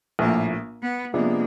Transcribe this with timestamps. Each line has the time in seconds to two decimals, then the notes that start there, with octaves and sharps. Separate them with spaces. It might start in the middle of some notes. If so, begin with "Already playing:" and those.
0.19 A#1 A2 F3 A#3
0.82 B3
1.14 C3 F3 G#3 A#3 B3 D4